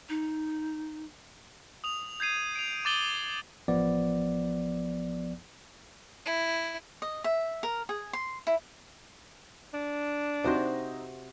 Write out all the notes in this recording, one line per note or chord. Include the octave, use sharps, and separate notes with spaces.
D#4
D#6 F7
G6 G#6 C7 D#7
D7 F7
D6 G6 A6 D#7 F#7 G7
A1 F3 B3 D5
E4
D#5
E5
A#4
G#4
C6
E4
D4
C3 C4 D#4 F#4 C5